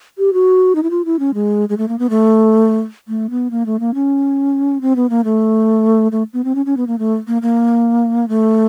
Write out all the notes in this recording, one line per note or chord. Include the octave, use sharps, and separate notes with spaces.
G4
F#4
D#4
E4
F4
E4
C#4
G#3
G#3
A3
A#3
B3
A3
A3
B3
A#3
A3
A#3
C#4
C4
B3
A#3
A3
A3
B3
C4
C#4
C#4
B3
A#3
A3
A#3
A#3
A3